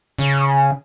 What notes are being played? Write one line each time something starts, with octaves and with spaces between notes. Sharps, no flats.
C#3